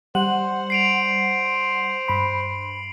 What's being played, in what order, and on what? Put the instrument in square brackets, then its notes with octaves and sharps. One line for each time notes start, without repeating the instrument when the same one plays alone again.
[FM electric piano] G3 F#5 [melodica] C5 [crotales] F#7
[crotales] C7 D7 F7
[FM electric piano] G2 B5